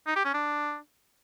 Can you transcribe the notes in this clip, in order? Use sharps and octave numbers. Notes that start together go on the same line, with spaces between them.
D#4
G4
C#4
D4